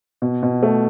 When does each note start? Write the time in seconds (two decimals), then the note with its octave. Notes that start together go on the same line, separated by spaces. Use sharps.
0.22 B2
0.43 B2
0.63 A3